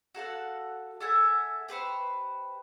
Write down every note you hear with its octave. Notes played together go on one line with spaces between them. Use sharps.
F#4 A4 F5 F#5
A4 E5 F#5 G#5
G4 B4 C5 C#6